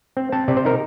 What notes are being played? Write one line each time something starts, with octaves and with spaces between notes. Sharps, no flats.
C4
C4 A5
C3 D5
C5
D#4 A#4